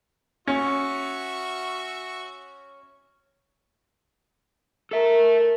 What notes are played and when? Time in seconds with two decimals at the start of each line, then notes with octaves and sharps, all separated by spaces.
0.48 C#4 F#4 E5
4.91 A4 A#4 E5